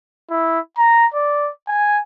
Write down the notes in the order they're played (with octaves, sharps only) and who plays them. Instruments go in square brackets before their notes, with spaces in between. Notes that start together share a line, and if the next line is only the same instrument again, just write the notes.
[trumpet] E4
A#5
D5
G#5